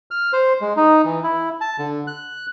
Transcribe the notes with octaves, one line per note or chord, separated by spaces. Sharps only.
F6
C5
G#3
D#4
E3
E4
A5
D3
F#6